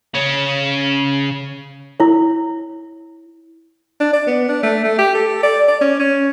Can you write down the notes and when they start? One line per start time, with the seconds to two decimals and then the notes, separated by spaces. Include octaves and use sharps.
0.15 C#3 C#4
2.00 E4 C#5
4.01 D4
4.13 D5
4.27 B3
4.49 D4
4.63 A3
4.84 A3
4.99 G4
5.15 A4
5.43 D5
5.68 D5
5.81 C#4
6.00 C#4